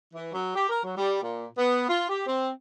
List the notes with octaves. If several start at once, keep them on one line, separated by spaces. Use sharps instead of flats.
E3
F#3
G4
A#4
F#3
G3
A#2
B3
F4
G4
C4